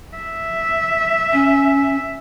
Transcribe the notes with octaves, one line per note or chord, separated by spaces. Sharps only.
E5
C#4